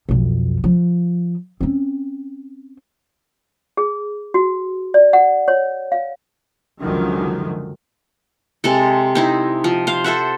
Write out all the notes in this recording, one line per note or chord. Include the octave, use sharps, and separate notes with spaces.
B1 F2
F3
C4 C#4
G#4
F#4
D5
F#5
C#5
F5
C#2 F#2 D3 D#3 F3
C3 G#3 A4
C4 D#4 E4
F3
C5 F5
A4 C5 E5 F#5